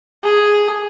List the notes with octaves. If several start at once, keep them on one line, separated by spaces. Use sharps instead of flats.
G#4